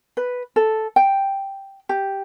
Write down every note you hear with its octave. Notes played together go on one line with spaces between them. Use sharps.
B4
A4
G5
G4